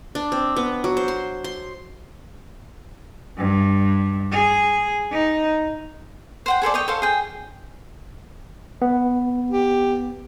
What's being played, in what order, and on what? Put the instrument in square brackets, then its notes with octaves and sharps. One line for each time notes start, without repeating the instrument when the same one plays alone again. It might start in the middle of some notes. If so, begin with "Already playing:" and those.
[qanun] D4
C4
B3
F#3
C5
C6
C6
[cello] G2
G#4
D#4
[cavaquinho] C5 F#5 G5
G#4 A4 C5 D5
C#5 D#5 G5
A4 C5 F5
G#4 G5
[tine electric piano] B3
[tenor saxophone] G4